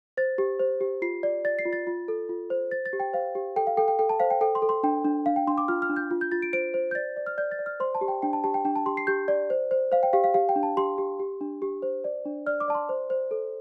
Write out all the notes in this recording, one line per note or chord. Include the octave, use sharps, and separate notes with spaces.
C5 A6
G4
C5
G4
F4 C7
D5
D5 A6
C7
F4
A6
F4
A4
F4
C5
C5 A6
A6
G4
G5
C5 F5
G4
A4 G5
F5
A4 G5
G5
A4 G5
A5
C5 F5
G5
A4 G5
C6
A4
C6
D4 G5
D4
D4 F5
G5
D4 C6
D6
F4 F6
F6
D4
G6
F4
G6
F4 A6
D7
C5 D7
C5
G6
D5 A6
D5
F6
D5 G6
A6
D5
F6
C5 C6
A5
G4
G5
D4 G5
A5
G4 A5
G5
D4 G5
A5
G4 C6
C7
G4 G6
D5
C5
C5
C5 F5
G5
G4 F5
F5
G4 F5
G5
D4
A5
G4 C6
G4
G4
D4
G4
C5
D5
D4
D5 F6
D6
D5 A5
C6
C5
C5
A4